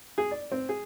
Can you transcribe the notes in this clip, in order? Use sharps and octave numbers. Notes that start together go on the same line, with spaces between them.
G#4
D5
C4
G#4